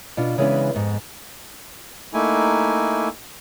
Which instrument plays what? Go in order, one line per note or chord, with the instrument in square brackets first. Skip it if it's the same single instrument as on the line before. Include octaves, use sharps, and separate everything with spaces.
[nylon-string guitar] B2 D4 F4
C#3 E3 G#3 B3 D4 B4
F2 G#2 B3
[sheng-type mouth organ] A3 A#3 D#4 E4 G#5